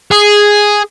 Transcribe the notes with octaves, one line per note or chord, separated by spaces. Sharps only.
G#4